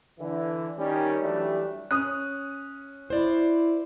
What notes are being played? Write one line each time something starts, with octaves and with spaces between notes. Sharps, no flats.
D3 E3
D#3 G3 C#4
E3 F#3 G3 A3 D4 G4
C#4 D#6 F#6
E4 C5 D5